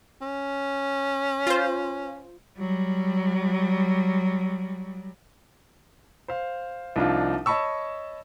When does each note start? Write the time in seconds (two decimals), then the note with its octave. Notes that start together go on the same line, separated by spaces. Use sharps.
0.22 C#4
1.47 F4 C5
2.58 F#3 G3
6.28 C5 F5
6.96 C2 F3 D4 D#4 F4
7.46 C#5 D#5 A5 B5 C#6 E6